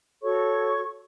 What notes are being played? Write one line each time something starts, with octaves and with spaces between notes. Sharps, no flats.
F#4 A4 C#5 C#6